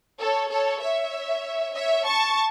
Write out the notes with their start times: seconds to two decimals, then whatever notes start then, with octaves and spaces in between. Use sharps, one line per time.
0.20 A4 C#5
0.51 A4 C#5
0.81 C#5 E5
1.75 C#5 E5
2.06 A5 C#6